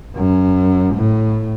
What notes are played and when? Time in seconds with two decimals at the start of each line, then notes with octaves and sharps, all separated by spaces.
0.15 F#2
0.94 A2